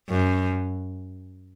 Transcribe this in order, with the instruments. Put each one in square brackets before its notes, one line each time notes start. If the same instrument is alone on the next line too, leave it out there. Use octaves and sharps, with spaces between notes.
[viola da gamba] F#2